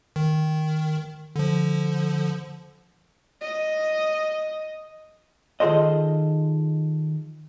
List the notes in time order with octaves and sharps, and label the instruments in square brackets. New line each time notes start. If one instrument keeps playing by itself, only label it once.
[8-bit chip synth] D#3
D3 F3
[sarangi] D#5
[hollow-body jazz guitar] D#3 F4 G#4 A4 C5 D#5